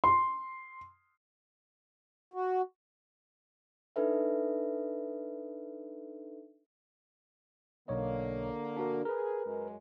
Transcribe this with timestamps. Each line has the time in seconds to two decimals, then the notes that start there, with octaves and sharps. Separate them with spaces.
0.04 C6
2.33 F#4
3.96 D4 D#4 A4 B4 E5
7.88 B1 D3 A#3 C#5 D#5
8.77 D4 F#4 A#4
9.05 G#4 A#4 B4
9.45 F#2 G#3